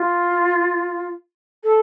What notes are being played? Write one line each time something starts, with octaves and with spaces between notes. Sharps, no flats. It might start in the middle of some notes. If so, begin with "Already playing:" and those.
Already playing: F4
A4